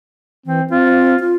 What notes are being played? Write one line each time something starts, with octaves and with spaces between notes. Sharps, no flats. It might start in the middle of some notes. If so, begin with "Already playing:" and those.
E3 C4
C4 F4
F4